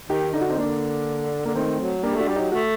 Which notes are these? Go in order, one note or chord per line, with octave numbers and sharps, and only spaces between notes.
D#3 D#4 G4
D3 D#4
F#4
C4 D#4
D3 A#3 D4
D3 A#3
D#3 A3 C4
F#3
G3 A#3 D4
G4
A3 D4 F#4
G3
F#3 D#4 G4
A3 F#4 A4